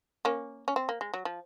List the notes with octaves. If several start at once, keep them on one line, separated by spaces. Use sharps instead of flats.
A#3 C#4
C#4
C4
A#3
G#3
F#3
F3